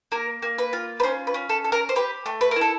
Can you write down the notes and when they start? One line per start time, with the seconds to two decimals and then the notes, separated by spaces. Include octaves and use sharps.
0.12 A#3 A#4
0.42 A#3
0.58 B4
0.73 F4
1.00 B4
1.03 C#4 C5
1.27 B4
1.34 C#4
1.49 A4
1.64 A4
1.72 A#4
1.89 C5
1.96 G4 B4
2.26 A3
2.41 B4
2.51 A#4
2.56 E4
2.61 A4